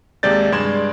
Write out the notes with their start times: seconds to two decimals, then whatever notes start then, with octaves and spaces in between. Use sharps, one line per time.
0.23 D#2 C3 G#3 D5 G6 A6
0.52 G2 G#3 D5 C6 G#6 E7